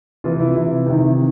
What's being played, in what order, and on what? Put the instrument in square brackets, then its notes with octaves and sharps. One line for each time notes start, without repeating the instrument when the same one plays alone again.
[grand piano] C3 E3 F4
E4
C3 E3
C3 D#3